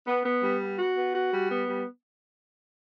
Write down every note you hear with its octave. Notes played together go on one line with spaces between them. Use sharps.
B3
B3
G3
B3
F#4
B3
F#4
G3
B3
G3